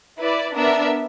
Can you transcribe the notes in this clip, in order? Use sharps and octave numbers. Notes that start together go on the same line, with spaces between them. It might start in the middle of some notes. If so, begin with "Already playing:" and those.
E4 B4 D5
B3 D4 A#4 E5